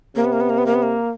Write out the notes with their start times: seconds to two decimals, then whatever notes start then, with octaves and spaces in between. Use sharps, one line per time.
0.16 C3 A#3
0.25 B3
0.33 A#3
0.40 B3
0.50 A#3
0.58 B3
0.66 A#3
0.74 B3
0.83 A#3